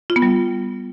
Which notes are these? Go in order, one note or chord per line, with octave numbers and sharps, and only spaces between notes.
F4
B3
G3